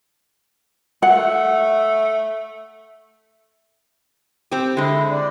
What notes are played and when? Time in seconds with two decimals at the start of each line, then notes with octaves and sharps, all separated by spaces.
1.02 A3 F#5
4.51 C4 G4
4.77 D3 G#3 E4
5.10 D5